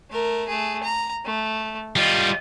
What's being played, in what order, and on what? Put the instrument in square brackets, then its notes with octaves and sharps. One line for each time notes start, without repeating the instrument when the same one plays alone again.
[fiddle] A3 A#4
A3 G#4
A#5
A3
[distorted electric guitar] G3 F4 [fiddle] D#5